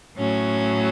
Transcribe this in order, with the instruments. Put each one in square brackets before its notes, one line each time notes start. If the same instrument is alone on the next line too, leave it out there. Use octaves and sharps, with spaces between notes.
[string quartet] A2 F#3 C#4